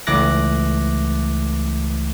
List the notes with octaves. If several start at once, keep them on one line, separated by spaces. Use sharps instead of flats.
C#2 E3 A3 D6 F#6 A#6